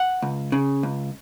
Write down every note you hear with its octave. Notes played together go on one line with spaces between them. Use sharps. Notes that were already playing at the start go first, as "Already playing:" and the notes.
Already playing: F#5
C#2
C#3
C#2